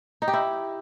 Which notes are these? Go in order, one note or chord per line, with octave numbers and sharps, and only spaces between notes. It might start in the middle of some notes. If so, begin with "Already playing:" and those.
D#4
G4
E4